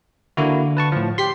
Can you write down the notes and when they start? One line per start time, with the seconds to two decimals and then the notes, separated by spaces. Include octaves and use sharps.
0.37 D3 A#3 E4 F#4
0.77 B4 A5 C#6
0.92 A2 F3
1.18 G4 C6 B6 C7